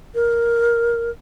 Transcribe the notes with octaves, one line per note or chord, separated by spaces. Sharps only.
A#4